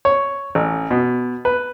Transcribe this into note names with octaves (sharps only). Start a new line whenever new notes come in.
C#5
A1
B2
B4